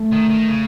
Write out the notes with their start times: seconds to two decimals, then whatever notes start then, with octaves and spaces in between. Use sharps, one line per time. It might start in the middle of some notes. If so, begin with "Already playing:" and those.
Already playing: A3
0.12 D#3
0.30 D#3
0.48 C#3